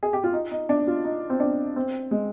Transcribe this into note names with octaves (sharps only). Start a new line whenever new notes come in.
G#4
G4
F4
D#4
D#4
D4
F4
D#4
C4
D4
C4
G#3